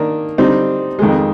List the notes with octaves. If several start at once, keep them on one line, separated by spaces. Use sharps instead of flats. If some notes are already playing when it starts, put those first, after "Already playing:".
Already playing: D#3 A#3 D4
D3 G3 C4 D#4
F2 D#3 G#3